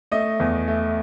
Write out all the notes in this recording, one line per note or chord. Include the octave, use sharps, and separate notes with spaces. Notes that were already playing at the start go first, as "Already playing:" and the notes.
A3 D#5
E2
A3